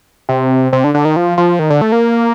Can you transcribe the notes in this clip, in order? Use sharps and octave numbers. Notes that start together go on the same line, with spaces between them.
C3
C3
D3
D3
D#3
F3
F3
D#3
D3
A3
A#3